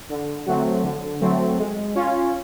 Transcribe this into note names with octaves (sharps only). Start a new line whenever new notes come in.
D3
F#3 A3 C4
D3
F#3 A3 C4
G#3
C#4 F4